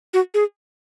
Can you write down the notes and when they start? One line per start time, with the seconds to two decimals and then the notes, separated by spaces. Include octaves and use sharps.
0.14 F#4
0.34 G#4